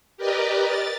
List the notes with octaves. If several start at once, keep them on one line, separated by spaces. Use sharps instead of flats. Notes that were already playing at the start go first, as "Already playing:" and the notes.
G4 A#4 B4 D5 D#5
A6